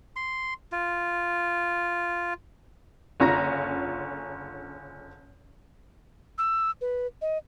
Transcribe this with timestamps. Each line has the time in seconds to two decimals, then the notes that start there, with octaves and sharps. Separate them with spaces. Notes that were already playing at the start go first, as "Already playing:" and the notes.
0.16 C6
0.72 F4
3.20 F#1 D3 C#4 F4 A#5 A#6
6.38 E6
6.81 B4
7.22 D#5